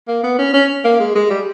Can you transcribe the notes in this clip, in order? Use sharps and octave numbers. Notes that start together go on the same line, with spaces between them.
A#3
B3
C#4
C#4
A#3
G#3
G#3
G3